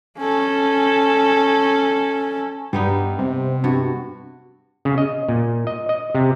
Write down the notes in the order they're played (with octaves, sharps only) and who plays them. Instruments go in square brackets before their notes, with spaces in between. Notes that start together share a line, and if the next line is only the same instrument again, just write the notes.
[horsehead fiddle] C#4 A4
[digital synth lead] G2 [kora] G3 B3 D#4
[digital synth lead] C3
[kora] G2 F#4
[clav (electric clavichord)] C#3
D#5
A#2
D#5
D#5
C3